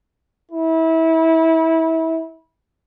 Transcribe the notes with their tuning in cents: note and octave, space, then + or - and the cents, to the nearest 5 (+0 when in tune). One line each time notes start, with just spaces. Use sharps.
E4 -25